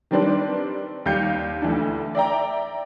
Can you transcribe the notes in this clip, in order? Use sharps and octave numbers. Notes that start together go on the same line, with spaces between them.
D#3 G3 C4 D4 B4 D5
D#2 G3 F5 G6 C#7
D2 E3 D4
D5 E5 G5 A#5